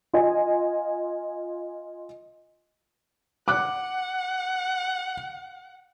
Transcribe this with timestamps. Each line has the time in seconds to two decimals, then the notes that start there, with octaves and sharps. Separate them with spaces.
0.13 F4 D#5 G#5
3.48 F#5 D6 F#6